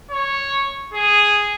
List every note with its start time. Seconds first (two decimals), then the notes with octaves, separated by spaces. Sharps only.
0.11 C#5
0.94 G#4